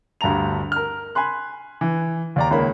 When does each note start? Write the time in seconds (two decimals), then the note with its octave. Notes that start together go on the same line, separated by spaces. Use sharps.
0.21 D2 G2 A5 A#5 F7
0.72 A#4 F6
1.15 G#5 B5 C6 F#6
1.81 E3
2.36 D#2 D5 A#5
2.50 C#2 D#3 A#3 C#5 B5